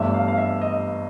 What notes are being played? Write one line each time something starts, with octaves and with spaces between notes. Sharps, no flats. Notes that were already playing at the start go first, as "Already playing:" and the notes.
Already playing: G1 G2 E3 A3 E5
F5
F5
E5
D#5